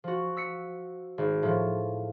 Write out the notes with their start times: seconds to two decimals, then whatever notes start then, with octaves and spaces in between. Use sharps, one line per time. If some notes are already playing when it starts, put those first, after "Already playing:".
0.04 F3 F#4
0.37 E6 B6 C#7
1.18 G#1
1.43 A2 F3